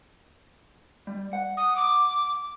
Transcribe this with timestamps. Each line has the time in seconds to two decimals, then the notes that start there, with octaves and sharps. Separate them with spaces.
1.07 G3
1.33 F#5
1.57 D#6
1.76 D6